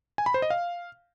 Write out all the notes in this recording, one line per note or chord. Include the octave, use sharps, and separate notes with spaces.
G#5
B5
C5
D#5
F5